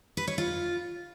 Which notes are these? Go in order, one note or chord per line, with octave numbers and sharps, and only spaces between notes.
B4
C#5
F4